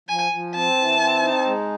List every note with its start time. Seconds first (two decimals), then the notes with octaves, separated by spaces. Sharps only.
0.09 F3 G#5
0.31 F3
0.54 C4 A5
0.77 E3
0.99 C4
1.22 D#4
1.45 G#3